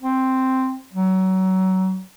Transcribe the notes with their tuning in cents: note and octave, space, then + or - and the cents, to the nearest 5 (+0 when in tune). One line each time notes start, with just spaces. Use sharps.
C4 +0
F#3 +25